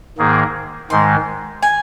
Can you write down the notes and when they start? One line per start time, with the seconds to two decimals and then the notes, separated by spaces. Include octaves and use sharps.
0.18 G#2 D#3 A#3 G#4
0.90 G#2 D#3 G#3 C6
1.63 G#5